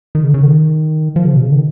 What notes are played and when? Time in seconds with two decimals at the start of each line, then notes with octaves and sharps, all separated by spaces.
0.15 D#3
0.24 C#3
0.34 C#3
0.43 D#3
1.16 F3
1.25 C#3
1.34 B2
1.43 C#3
1.52 D#3